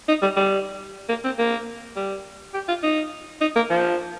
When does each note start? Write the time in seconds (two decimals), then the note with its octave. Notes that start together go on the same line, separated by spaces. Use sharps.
0.09 D#4
0.22 G3
0.37 G3
1.09 A#3
1.24 C4
1.39 A#3
1.96 G3
2.54 G4
2.69 F4
2.83 D#4
3.41 D#4
3.56 A#3
3.70 F3